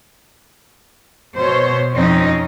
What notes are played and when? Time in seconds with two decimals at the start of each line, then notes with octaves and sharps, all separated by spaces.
1.35 B2 C5 C#5
1.93 F2 C4 C#4 D#4